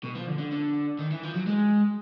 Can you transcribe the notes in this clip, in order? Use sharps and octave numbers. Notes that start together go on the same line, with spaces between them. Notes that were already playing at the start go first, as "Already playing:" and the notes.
B2
F3
D3
D3
D3
D#3
E3
F3
F#3
G#3